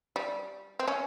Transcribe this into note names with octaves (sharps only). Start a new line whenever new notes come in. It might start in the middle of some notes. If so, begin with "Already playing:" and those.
G3
C4
C#4